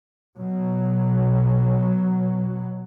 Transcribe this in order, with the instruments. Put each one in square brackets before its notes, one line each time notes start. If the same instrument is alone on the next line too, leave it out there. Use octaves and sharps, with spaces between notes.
[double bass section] B2 F#3